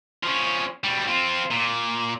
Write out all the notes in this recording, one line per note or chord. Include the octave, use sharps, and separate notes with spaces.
F3 C#4
B2 G3
C4 F4
A#2